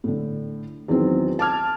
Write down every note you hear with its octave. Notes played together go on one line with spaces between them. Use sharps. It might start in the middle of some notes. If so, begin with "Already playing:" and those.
A2 D3
E2 D#3 F#3 C4
A5 D6 F6 G#6